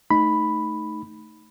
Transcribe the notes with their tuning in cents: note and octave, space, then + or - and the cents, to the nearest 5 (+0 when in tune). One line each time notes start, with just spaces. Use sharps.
A3 +0 D#4 +0 B5 +0